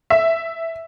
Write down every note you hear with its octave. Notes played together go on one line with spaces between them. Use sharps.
E5